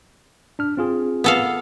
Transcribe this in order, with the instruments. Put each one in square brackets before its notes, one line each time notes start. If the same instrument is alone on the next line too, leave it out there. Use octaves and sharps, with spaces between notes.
[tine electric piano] D4 F6
C4 F4 G#4
[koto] B3 A4 F5